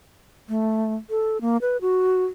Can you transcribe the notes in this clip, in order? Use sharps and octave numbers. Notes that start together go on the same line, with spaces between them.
A3
A4
A#3
B4
F#4